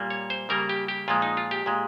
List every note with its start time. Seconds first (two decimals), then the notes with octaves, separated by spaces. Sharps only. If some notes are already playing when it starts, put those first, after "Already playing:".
Already playing: A#2 G3 A#3
0.10 C#5
0.30 C5
0.49 C#3 G3 A#3 A#4
0.69 G4
0.88 G4
1.08 A#2 F3 G#3 F4
1.22 D#4
1.37 F4
1.51 G4
1.66 A#2 G#3